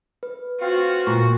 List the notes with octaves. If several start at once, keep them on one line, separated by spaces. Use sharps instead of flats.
B4
C4 F4 F#4 F5
A#2 C#6